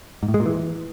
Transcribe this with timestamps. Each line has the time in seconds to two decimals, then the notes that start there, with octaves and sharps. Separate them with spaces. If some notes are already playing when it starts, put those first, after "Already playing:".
0.23 G#2
0.28 A2
0.34 G#3
0.40 A#2
0.46 E3